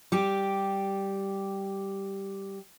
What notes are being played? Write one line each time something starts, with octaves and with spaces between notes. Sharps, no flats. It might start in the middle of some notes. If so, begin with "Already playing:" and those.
G3 G4